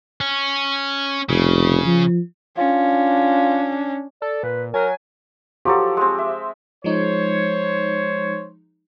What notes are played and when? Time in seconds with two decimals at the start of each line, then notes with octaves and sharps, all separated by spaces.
0.21 C#4
1.29 F1 C#3
1.86 F3
2.57 C#4 D4 F4
4.22 A4 D5
4.43 A#2 B4
4.74 F#3 A#4 G#5
5.65 F3 F#3 G4 A4
5.97 G#3 C4
6.18 E5
6.84 F3 G#3 D#4 C5 C#5